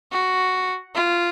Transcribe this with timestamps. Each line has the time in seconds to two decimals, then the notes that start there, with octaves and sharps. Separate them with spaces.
0.12 F#4
0.95 F4